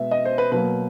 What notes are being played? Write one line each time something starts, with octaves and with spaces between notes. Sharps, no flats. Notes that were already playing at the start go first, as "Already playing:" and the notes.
Already playing: B2 G#3 B3 E5
D#5
C5
B4
B2 F#3 A#3 B4